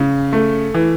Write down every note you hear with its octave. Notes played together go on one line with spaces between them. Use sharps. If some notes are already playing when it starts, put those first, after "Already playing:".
Already playing: C#3
A3
E3